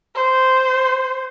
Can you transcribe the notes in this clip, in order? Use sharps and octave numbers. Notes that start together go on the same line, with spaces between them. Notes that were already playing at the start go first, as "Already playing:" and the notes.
C5